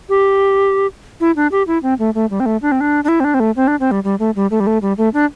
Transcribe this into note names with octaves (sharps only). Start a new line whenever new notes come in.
G4
E4
D4
G4
E4
C4
A3
A3
G3
C4
A3
D4
C4
D4
D4
E4
C4
D4
C4
A3
C4
D4
C4
G3
G3
A3
G3
A3
G3
A3
G3
A3
D4